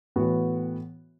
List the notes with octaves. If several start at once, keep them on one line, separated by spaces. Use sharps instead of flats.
A2 E3 B3 F#4